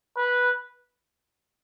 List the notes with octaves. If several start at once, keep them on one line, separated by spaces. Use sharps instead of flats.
B4